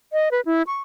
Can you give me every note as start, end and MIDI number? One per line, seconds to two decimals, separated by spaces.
0.13 0.29 75
0.31 0.41 71
0.45 0.62 64
0.67 0.82 85